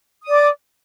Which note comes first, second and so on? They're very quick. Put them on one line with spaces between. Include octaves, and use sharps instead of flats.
D#6 D5 D6